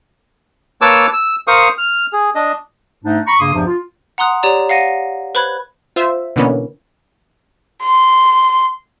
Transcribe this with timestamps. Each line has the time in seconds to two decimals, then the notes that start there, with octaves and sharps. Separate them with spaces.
0.81 A#3 B4 C#5 A5 D6 E6
1.13 E6
1.47 A#4 C5 F5 C#6 D#6
1.78 F6
2.13 G#4
2.35 D4 D#5
3.04 G#2 A3 D4 D#4
3.27 A#5 B5 C#6
3.40 G2 C#3 A#3 C6 D#6
3.54 E2 G2 C3 F3
3.67 F4
4.18 F#5 A#5 C6 D#6 F#6
4.43 G4 C#5 D5 A#5
4.69 F5 F#5 A#6 D#7
5.35 B4 C5 B5 F#6 G#6
5.96 F4 C5 E5
6.36 B2 D3 E3 A#3 B3 C#4
7.82 C6